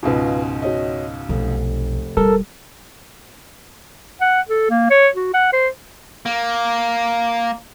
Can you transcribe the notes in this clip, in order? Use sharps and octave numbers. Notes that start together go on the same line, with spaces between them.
C#2 G#2 B2 F4 B4
F#4 C#5 D#5
F1 B1
D#1 G3 A4 A#4
F#5
A4
A#3
C#5
F#4
F#5
C5
A#3